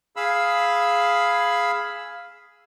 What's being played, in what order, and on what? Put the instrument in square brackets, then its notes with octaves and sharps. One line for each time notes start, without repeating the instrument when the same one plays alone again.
[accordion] G#4 F5 B5 E6